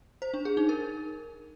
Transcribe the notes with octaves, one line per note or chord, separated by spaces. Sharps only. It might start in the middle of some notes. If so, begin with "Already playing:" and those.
C5
D4
G#4
D#4
A#4